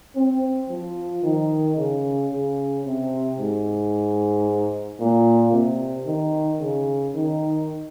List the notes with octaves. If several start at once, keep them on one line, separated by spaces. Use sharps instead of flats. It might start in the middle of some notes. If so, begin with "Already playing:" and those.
C4
F3
D#3
C#3
C#3
C3
G#2
A#2
C3
D#3
C#3
D#3